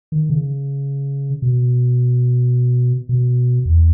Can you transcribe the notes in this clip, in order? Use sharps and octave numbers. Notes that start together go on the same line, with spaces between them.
D#3
C#3
B2
B2
E2